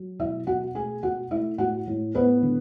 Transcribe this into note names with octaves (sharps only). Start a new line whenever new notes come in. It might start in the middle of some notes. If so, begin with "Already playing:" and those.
Already playing: F#3
B2 E4 E5
B2 F#4 F#5
A3 G#4 G#5
B2 F#4 F#5
A3 E4 E5
A2 F#4 F#5
A2
A2 B3 B4
D3